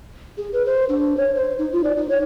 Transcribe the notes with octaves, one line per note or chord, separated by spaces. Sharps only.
G#4
B4
C5
D4
C#5
C5
D#4
F4
D5
D#4
C#5